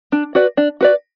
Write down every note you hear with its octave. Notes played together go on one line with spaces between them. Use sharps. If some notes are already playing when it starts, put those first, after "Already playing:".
D4
F#4 B4 D5
D4
F#4 B4 D5